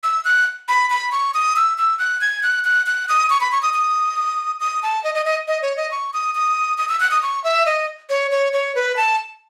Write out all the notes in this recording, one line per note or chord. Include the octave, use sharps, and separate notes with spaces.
E6
F#6
B5
B5
C#6
D#6
E6
E6
F#6
G#6
F#6
F#6
F#6
D#6
C#6
B5
C#6
D#6
D#6
D#6
A5
D#5
D#5
D#5
D#5
C#5
D#5
C#6
D#6
D#6
D#6
E6
F#6
D#6
C#6
E5
D#5
C#5
C#5
C#5
B4
A5